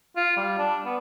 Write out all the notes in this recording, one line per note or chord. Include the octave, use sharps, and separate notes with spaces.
F4
G3
D4
B3